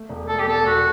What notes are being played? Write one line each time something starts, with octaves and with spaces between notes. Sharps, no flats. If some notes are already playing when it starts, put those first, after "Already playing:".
Already playing: A3
E1
A3 A4
G4
E2 A4
E1 F#4